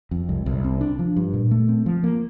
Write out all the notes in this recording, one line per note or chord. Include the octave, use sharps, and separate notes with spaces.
F2
C2
C2
C4
D4
F3
G2
A#2
A3
C4
F3
A#3